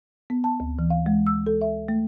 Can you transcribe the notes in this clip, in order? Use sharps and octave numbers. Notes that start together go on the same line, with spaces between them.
B3
A5
D2
E3
F5
G#3
E6
A4
E5
A3